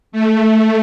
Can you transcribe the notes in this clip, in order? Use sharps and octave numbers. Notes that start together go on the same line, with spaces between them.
A3